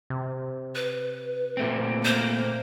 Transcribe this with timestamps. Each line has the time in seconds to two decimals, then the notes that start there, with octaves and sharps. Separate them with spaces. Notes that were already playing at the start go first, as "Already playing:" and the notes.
0.10 C3
0.75 B4
1.57 A#2 A3 C4
2.05 A#3 C5